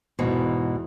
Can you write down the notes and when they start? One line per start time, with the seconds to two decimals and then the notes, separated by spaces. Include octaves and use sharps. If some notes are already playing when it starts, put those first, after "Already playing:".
0.19 E2 G#2 B2 E3